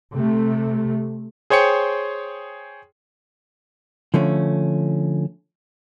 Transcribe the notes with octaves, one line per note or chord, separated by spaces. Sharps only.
C3 A3
G#4 C5 C#5 G5 C#7
D3 F3 A3 C#4